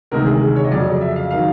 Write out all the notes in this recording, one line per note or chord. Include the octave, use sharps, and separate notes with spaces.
D2 C3 D#3 G#3 A#4
G#4
C#5
D#5
F2 C#3 F#3 D5
E5
F5
D#3 F#3 F5